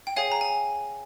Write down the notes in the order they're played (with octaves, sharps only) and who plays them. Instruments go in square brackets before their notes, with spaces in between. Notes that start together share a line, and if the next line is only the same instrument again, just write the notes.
[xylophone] G5
G#4 C#5 F5 G#5
A#5
G#5